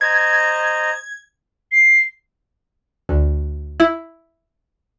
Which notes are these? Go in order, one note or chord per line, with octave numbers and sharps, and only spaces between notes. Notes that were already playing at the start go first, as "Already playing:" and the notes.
C5 D#5 A#5 G#6
C7
D2
E4